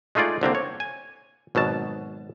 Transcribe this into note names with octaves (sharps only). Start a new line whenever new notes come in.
G#3 A3 D#4 F4 G#4 D5
C2 D3 A#3 C4
C#5
G#5
G#1 B2 F#3 A5